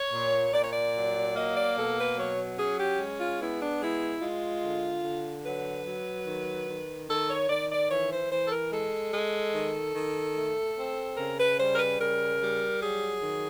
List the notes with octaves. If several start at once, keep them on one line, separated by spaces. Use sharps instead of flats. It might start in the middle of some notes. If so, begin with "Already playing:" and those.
Already playing: C#5
A#2
A#2 D5
C#5
D5
F#3
A#3 D#5
D5
B2 A4
B4
F#3 C#5
C#4 G#4
G4
G#3
F4
B3 E4
D4
G#3 E4
G#3 F4
D3
D3
F#3 B4
F#3
D#3
D#3
D#3 A4
C#5
D#3 D5
D5
E3 C#5
C5
E3 C5
A4
A#4
G#3 A4
G#3
D#3
D#3
A3
C4
C#3 A#4
B4
G3 C5
A#4
B4
C#3 A#4
G3
F#3 G#4
D#3